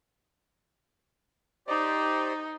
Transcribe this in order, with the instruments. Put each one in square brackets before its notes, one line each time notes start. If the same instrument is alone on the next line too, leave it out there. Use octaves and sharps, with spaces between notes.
[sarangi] D#4 [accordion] G4 C5 D5